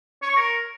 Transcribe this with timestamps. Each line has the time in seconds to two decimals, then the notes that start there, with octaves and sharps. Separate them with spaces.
0.23 C#5
0.30 C#6
0.37 A#4